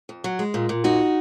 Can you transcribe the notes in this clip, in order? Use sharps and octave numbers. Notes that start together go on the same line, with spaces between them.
F2
F#3
G#3
A#2
A#2
F#2 D#4 F#4